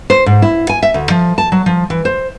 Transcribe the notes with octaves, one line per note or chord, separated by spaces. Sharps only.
C5
G#2
E4
G#5
E5
D2
F3
A5
F#3
F3
E3
C5